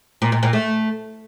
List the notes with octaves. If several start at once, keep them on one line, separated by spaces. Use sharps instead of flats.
A#2
A#2
A#2
A3